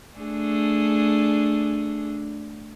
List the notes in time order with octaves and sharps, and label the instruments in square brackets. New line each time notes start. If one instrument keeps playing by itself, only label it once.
[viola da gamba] A3 D4 G#4